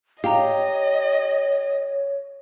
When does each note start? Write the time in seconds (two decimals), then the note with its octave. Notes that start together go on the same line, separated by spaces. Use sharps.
0.24 G4 C#5 D#5 F5 A#5